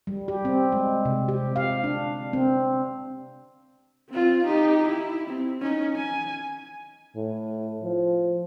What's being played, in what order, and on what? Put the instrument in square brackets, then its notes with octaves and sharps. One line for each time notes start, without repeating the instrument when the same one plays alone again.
[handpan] G3
G4
C4
G#3
C3
G4
F5
D4
C4
[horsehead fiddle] C4 F4
D#4 G4
E4
C4
C#4 D#4
G#5
[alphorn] A2
F3